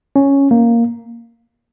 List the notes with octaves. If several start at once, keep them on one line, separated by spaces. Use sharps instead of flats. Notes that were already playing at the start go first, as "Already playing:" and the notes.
C#4
A#3